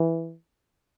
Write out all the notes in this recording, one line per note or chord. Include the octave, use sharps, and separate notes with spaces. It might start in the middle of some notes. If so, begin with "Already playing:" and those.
Already playing: E3